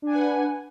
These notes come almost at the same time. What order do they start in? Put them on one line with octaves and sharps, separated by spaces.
D4 G#5 F#5 B4